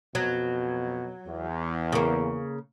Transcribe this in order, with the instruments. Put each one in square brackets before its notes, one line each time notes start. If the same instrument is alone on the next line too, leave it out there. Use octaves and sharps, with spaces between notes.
[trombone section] F2 B2 [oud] F#3
[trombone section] E2
[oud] C#3 A#3